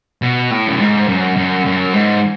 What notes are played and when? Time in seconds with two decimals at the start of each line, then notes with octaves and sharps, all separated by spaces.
0.22 B2
0.51 A2
0.68 F#2
0.80 G#2
1.08 F#2
1.37 F#2
1.65 F#2
1.94 G#2